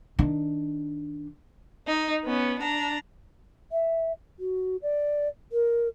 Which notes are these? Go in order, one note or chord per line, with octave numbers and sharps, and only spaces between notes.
D#3 D4
D#4
B3 C#4
D4 A#5
E5
F#4
D5
A#4